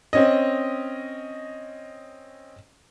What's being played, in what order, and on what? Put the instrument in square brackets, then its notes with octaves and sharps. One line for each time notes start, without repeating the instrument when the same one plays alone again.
[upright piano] C4 C#4 D#5